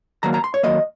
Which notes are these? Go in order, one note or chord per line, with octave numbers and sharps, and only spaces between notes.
D#3 F#3 A#3 A#5
A#5
C6
C#5
D#3 F#3 A#3 D#5